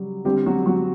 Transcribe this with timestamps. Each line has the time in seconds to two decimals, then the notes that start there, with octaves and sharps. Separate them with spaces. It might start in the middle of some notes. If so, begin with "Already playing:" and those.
Already playing: C#3 F#3 G3
0.25 D3 G3 C4 G4
0.46 F#3 F#4
0.66 F#3 F#4